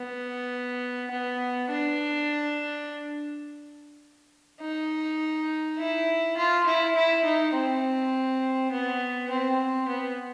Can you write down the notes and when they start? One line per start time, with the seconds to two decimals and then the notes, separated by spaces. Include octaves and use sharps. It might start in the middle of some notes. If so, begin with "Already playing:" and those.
Already playing: B3
1.11 B3
1.70 D4
4.61 D#4
5.78 E4
6.37 F4
6.66 E4
6.95 E4
7.24 D#4
7.53 C4
8.71 B3
9.30 C4
9.88 B3